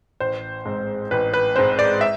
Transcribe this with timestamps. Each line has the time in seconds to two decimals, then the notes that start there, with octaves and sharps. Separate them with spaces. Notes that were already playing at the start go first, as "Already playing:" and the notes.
0.20 A1 C5
0.65 G#2 G#3 C4
1.11 A1 B4
1.34 B4
1.56 G#2 G#3 C4 C5
1.79 D5
2.01 E5